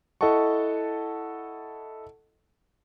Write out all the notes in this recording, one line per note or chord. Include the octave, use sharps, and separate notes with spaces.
E4 A4 D#5 F#5 A5 C#6